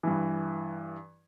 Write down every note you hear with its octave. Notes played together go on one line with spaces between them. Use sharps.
G2 E3